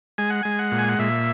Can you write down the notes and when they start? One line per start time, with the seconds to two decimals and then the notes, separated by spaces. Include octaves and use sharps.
0.18 G#3 G#5
0.30 F#5
0.43 G#3 G#5
0.59 F#5
0.72 A#2
0.78 G#5
0.89 F#5
0.99 A#2 E5